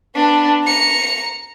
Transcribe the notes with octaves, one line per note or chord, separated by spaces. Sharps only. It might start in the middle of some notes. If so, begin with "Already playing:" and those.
B3 D4
A#5 C#7